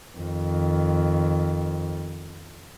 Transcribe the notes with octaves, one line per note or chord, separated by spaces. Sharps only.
F2 D#3